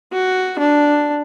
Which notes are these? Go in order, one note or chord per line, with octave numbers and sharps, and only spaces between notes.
F#4
D4